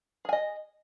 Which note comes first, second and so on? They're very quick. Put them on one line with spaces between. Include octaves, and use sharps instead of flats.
G#4 G#5 D#5